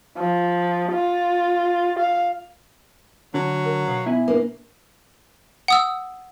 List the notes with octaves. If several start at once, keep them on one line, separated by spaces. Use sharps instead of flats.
F3
F4
F5
D3 F#3
A#4
B2 F5
B3 E4 G#5
A#3 D4 B4
F#5 D#6 E6